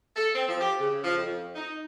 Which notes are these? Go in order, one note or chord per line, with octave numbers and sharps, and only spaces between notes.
A4
C4
F3
G4
C#3
F3
F2
D#4